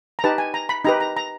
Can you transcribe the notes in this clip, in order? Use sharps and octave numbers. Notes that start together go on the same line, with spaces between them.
A#5
D#4 G4 B4 A5
G#5
A#5
B5
D#4 G4 B4 A#5
A#5
A#5